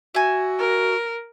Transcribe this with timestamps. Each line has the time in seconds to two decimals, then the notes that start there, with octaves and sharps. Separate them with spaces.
0.15 F#4 E5 G#5
0.59 A#4